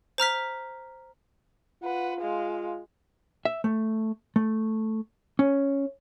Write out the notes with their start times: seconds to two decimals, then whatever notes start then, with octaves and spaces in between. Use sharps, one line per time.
0.18 C5 A#5 F6 B6
1.83 F4 B4 F#5
2.21 G#3 F5
3.45 E5
3.64 A3
4.36 A3
5.39 C#4